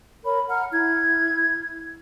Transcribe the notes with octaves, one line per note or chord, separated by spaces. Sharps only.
A#4 C#5 B5
F#5 A#5 F6
E4 G#6